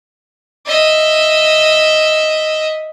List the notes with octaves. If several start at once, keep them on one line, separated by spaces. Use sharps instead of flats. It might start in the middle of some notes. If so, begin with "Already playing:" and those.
D#5 E5